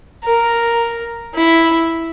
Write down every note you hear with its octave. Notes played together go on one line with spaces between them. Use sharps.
A#4
E4